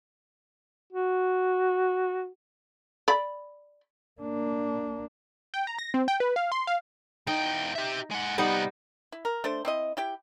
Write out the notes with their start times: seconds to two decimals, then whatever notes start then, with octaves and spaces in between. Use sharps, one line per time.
0.93 F#4
3.08 D5 B5
4.21 A#3 D4
5.54 G5
5.67 A#5
5.79 A#6
5.94 C4
6.08 G5
6.20 B4
6.36 F5
6.52 C6
6.67 F5
7.27 E2 D#4 G5
7.75 G4 E5
8.11 G#3 F#5
8.38 C3 G3 B3 D#4 F#5
9.12 E4
9.25 A#4
9.44 A3 D4 C5
9.65 C4 E4 D#5
9.97 E4 G4 G5